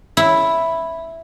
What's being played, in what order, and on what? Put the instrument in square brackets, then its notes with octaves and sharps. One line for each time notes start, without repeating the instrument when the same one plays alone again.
[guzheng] E4